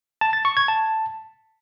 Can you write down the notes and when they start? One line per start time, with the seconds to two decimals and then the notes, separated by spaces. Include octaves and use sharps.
0.21 A5
0.33 A6
0.45 C#6
0.57 G#6
0.68 A5